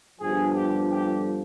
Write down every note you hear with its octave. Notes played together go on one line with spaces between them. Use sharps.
G1 G2 D3 F3 G#4
G4
G4